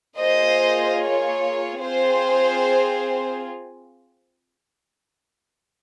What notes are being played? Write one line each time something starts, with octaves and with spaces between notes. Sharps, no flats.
A#3 F4 G#4 C5 D#5
C#5
C4 F4 G#4 C5